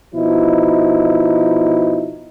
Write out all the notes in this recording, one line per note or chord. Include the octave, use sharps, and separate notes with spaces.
B2 F3 D#4 E4